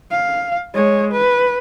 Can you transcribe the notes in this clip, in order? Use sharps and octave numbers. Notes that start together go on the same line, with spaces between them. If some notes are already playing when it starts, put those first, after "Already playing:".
F5
G#3 C#5
B4